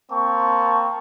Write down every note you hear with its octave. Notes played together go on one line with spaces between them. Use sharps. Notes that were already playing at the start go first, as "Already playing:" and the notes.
A#3 C4 A5 C#6